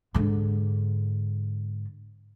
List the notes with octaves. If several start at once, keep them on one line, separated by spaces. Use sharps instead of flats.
G#2 D3